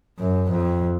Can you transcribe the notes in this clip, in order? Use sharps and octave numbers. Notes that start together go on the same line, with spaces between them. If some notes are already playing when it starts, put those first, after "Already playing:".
F#2
F2